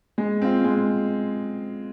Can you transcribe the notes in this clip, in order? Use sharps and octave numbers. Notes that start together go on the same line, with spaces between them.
G#3
C4 F4
G#3